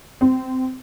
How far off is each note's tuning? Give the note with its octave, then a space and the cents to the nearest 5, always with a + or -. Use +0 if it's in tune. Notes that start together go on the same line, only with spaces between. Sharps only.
C4 -15